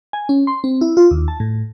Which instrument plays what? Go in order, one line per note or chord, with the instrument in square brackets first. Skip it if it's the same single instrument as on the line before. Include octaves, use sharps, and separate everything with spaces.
[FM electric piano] G#5
C#4
C6
C4
E4
F4
D#2
A5
A2